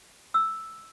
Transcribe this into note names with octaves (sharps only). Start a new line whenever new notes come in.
E6